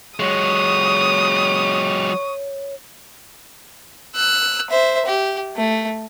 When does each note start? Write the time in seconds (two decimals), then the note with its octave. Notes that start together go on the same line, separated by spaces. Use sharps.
0.20 F#3 G#3 C#5 C#6 D#6
4.16 E6 F#6
4.70 C5 E5
5.06 G4
5.57 A3